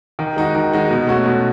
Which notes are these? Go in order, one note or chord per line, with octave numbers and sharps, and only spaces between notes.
D#3
G#3 D#4 F#4
D#3
G#3 D#4 F#4
B2
A3 C#4 F#4
B2